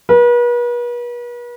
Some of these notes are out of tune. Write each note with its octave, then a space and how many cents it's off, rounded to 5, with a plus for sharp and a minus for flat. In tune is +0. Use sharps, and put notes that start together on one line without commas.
B4 -40